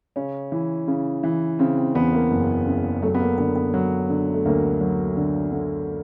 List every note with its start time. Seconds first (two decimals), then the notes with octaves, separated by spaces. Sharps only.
0.16 C#3 C#4
0.52 E3
0.88 C#3
1.23 E3
1.59 C#3 C4
1.78 C4
1.95 E2 B3
2.13 A#3
2.31 F#1
2.67 C#3
3.02 F#3 A3
3.14 B3
3.20 A#3
3.37 D3 B3
3.56 B3
3.74 F#3
4.10 D3
4.34 A3
4.45 D2 A#3
4.81 F#3
5.17 D3
5.52 D3